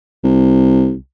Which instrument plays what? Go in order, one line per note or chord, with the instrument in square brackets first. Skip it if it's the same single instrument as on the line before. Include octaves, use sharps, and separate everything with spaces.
[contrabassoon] C2